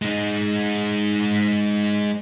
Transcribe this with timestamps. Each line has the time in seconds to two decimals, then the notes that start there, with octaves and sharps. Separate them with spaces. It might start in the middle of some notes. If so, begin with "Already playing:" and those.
0.02 G#3 D#4